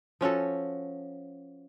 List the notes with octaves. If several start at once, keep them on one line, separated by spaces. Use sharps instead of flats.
F3 C#4 F#4 A4